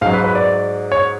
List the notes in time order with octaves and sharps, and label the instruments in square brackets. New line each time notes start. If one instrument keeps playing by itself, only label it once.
[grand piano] G#2 F#3 F5
B4
B4
D5
C#5